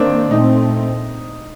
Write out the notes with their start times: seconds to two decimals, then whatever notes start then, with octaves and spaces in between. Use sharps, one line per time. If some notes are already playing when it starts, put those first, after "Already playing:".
Already playing: D#3 A#3 C4 D4
0.31 A#2 A3 C4 D#4